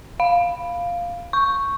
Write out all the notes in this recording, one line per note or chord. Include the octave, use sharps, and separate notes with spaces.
F5
C#6